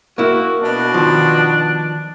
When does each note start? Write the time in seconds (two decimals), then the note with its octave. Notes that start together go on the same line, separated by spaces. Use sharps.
0.18 A#3 E4 F#4
0.62 B2 D4
0.94 D#3 F3